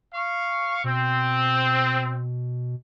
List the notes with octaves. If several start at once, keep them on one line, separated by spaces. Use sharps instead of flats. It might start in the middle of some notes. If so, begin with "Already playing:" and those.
F5 C#6
B2 C4